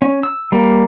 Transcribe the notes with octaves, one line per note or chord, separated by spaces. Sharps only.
C#4
E6
G3 A#3